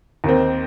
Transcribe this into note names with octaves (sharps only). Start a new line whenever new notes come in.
D#2 D#3 C4